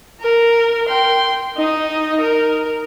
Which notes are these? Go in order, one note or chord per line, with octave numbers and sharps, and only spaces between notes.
A#4
G5 C6
D#4 D#5
A#4